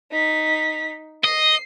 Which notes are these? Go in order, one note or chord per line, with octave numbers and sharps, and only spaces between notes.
D#4 B6
D#5 C7